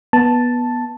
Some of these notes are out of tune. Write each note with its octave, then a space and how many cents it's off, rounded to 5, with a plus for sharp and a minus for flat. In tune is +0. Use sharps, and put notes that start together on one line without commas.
B3 -15 A5 +0